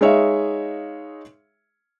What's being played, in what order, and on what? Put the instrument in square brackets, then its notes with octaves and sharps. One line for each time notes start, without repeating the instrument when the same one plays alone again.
[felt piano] G#3 D#4 G#4 C#5 E5 F5